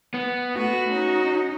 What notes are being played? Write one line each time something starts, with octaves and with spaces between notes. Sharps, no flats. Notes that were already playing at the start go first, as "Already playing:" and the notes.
B3
A3 F#4 B4
C#4 D#4